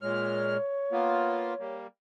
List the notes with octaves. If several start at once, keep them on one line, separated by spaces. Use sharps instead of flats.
A#2 G#3 C#5 F6
A#3 B3 F4
G3 A#3